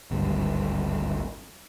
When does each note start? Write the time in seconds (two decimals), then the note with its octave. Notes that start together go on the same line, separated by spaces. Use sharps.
0.11 G#1 D2 G2